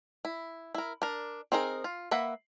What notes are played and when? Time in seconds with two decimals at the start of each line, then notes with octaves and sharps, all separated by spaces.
0.25 E4
0.74 E4 A#4
1.02 D4 A#4
1.52 C4 D#4 G#4 A#4
1.84 F4
2.11 A#3 B4 E5 F#5